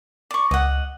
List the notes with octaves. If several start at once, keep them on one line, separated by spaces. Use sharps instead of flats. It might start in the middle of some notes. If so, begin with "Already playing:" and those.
D5 C#6
C#2 D#5 F#5